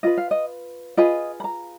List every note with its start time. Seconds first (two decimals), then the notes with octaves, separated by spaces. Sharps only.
0.03 F4 B4 D#5
0.18 F5
0.31 D#5
0.97 F4 G#4 B4 D#5
1.40 B5
1.44 A#5